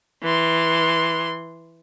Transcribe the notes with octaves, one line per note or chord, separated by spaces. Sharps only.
E3 C6